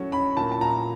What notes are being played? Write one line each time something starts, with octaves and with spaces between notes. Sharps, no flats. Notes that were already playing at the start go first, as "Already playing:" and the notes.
Already playing: F#3 A3 C#4
C#4 B5
A#2 A5
A5
A#2 A#5